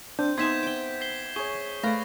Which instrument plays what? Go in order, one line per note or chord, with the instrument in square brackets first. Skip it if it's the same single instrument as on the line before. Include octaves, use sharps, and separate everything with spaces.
[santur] C4 [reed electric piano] D4 [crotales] G6
[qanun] B3 D#4 G#5 [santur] E5 [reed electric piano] C6 [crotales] G#6 B6 E7
[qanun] G5 D6
[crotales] B6 C7 G7
[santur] G#4 C#5 [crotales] C#6 G7
[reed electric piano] A3 F5 [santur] B4 [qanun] D5 A#5 [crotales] A#6